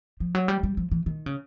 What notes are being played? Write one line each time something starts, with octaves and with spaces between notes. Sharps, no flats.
F3
F#3
G3
G3
F3
E3
D#3
C#3